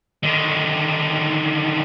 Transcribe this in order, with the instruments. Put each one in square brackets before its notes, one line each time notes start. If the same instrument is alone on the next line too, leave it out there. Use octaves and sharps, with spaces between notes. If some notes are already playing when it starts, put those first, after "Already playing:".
[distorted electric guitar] D3 D#3